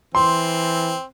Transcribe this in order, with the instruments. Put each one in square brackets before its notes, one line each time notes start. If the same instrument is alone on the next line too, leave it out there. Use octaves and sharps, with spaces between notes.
[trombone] E3 [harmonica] C4 [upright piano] C6